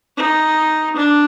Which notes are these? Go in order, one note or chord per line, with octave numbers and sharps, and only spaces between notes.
D#4
D4